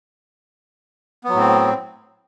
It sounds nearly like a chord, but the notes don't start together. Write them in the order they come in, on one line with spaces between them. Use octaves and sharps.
B3 F#3 A2 C4